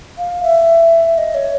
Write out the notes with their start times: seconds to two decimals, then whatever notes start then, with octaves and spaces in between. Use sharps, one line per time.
0.18 F5
0.43 E5
1.18 D#5
1.34 C#5